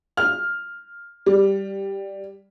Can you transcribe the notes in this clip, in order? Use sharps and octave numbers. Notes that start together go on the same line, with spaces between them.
F6
G3